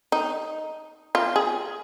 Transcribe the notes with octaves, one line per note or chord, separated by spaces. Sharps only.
D#4
F4
G#4